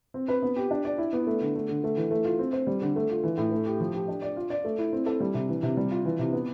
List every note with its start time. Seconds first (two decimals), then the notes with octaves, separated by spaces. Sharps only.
0.14 C4
0.28 B4
0.42 B3
0.56 G4
0.71 D4
0.85 D5
0.98 E4
1.13 B3
1.27 A3
1.41 D3
1.55 A3
1.69 D3
1.84 A3
1.97 E3
2.11 A3
2.25 F4
2.39 C4
2.53 C5
2.67 G3
2.82 D3
2.96 A3
3.10 F4
3.23 E3
3.38 A2
3.52 A3
3.66 G4
3.81 F3
3.94 G4
4.08 D4
4.22 D5
4.36 F4
4.50 D5
4.64 A3
4.78 E4
4.93 C4
5.06 A4
5.20 G3
5.34 C3
5.49 E3
5.63 C3
5.77 G3
5.91 F4
6.05 E3
6.19 C3
6.33 B3